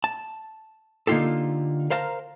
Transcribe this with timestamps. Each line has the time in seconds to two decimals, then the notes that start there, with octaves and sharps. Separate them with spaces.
0.04 A5
1.07 D3 A#3 D#4 F4 G4 A4
1.90 A#4 C5 F5 A5 A#5